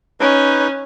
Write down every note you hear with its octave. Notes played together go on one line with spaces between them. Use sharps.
C#4 D#4 B4